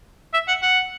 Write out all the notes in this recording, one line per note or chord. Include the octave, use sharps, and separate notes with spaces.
E5
F#5
F#5